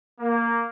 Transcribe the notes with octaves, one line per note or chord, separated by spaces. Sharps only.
A#3